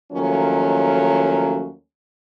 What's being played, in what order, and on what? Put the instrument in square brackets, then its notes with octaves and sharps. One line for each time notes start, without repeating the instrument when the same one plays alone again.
[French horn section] D#2 D#3 F3 F#3 A3 C#4